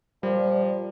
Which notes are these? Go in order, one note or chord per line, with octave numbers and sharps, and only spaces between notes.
A#2 F3 G3